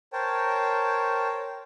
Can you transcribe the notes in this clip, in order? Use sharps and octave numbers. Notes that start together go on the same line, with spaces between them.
A#4 C5 C#5 G5 A5